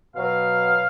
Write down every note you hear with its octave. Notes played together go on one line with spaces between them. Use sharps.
B2 F#3 F5